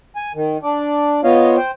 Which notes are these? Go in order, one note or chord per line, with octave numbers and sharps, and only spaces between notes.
G#5
D#3
D4 D5
B3 F4 C#5 D#5 F5
C5 G5